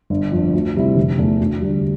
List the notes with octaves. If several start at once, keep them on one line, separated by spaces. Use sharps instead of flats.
G1
F2 D3
D2
C3 G3 C4 E4
F1
E2 E3 A3
D2
D3 G3